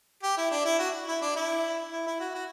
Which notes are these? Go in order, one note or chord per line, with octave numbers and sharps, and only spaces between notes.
G4
E4
D4
E4
F#4
E4
D4
E4
E4
E4
F#4
F#4